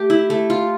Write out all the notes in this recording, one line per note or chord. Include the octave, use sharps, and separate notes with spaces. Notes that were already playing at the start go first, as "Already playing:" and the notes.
Already playing: A3 G4
E4
A3
F4